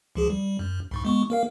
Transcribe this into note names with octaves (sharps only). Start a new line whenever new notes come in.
C#2 F3 G#4
G3
F#2
C2 G#2 C#6
G#3 B3 C#6
A#3 A#4 F5